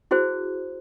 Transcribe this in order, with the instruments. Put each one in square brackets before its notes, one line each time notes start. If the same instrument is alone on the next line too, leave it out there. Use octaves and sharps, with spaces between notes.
[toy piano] E4 F#4 G#4 C5